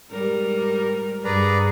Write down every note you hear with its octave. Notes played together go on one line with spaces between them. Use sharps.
G#2 G3 A#4
G2 G#4 B4 D5 A#5